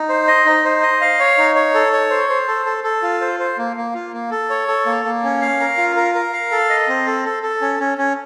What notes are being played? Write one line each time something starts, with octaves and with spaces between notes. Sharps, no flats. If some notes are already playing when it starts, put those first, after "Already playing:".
Already playing: D#4
C5
D#5
D#4
C5
D#5
F5
C#5
D#4
C#5
A4
C#5
C5
C5
A4
A4
A4
F4
C5
C5
A#3
A#3
F4
A#3
A4
C#5
A4
A#3
A#3
C#4
F5
A#4
F4
A#4
A#4
F5
A4
D#5
C4
A4
A4
A4
C#4
C#4
C#4